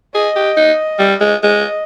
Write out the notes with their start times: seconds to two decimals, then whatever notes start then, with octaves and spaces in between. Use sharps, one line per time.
0.15 G#4 D#5
0.36 G4
0.57 D#4
0.99 G3
1.20 G#3
1.43 G#3 D#5